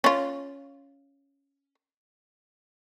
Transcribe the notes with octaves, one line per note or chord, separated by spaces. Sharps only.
C#4 F4